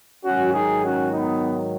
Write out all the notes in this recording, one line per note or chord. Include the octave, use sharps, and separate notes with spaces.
G#2 D#3 F#3 C#4 F#4
D#4 G#4
C#4 F#4
B3 D#4